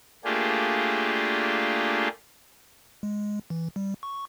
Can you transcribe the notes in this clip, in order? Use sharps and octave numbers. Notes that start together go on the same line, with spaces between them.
A3 A#3 D4 F4 G4 G#4
G#3
E3
G3
C#6